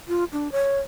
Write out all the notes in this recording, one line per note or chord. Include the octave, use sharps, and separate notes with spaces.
F4
D4
C#5